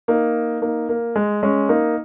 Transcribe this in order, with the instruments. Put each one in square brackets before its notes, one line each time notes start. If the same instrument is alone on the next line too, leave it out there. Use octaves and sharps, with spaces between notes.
[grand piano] A#3 D#4
A#3 D#4
A#3
G#3
G#3 C#4
A#3 D#4